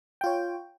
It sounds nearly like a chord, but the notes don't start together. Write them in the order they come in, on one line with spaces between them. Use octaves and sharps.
G5 F4 C#5